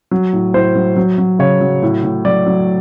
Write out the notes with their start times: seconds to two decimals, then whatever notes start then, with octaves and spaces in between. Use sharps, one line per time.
0.11 F#3
0.33 A2
0.54 A2 C5
0.75 F#3
0.96 F#3
1.18 F#3
1.39 C#3 C#5
1.61 F#3
1.82 A2
2.04 A2
2.25 F#3 D5
2.46 F#3